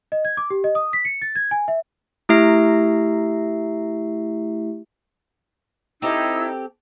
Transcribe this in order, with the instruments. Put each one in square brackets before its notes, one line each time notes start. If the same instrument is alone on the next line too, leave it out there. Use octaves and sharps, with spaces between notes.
[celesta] D#5
G#6
D6
G4
D#5
D#6
B6
C#7
A6
G#6
G#5
E5
[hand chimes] A3 E4 G4 E5 C7
[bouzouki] C4 G4 A4 [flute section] D#4 E4 E6